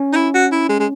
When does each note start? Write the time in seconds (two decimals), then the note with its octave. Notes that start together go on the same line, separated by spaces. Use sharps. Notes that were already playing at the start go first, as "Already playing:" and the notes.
Already playing: C#4
0.13 D#4
0.16 E4
0.34 F#4
0.52 E4
0.69 G#3
0.80 G#3